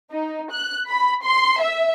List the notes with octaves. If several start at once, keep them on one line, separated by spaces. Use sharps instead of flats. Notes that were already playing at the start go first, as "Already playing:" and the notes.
D#4
F#6
B5
C6
E5